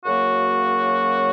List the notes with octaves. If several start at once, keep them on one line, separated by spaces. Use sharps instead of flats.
F#2 C#3 F#3 A#3 F#4